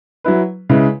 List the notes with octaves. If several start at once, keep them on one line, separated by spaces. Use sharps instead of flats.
F#3 E4 B4
C#3 G#3 E4 B4